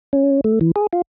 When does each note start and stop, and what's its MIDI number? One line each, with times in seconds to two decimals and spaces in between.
0.13 0.41 61
0.44 0.59 57
0.61 0.71 52
0.76 0.87 68
0.93 1.02 65